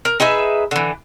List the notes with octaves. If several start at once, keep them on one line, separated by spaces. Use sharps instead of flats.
A#4
D#4 G#4 B4 E5
D3 E3